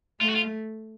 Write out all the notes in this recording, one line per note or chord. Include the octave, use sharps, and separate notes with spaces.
A3 F4
F#4
F4